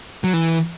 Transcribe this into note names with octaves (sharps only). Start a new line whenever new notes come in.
F#3
E3